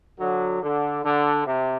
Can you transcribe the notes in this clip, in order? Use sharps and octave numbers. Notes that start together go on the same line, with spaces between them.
D3 F#3
D3
D3
C3